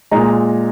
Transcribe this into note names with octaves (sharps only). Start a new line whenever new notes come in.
A#2 G#3 A#5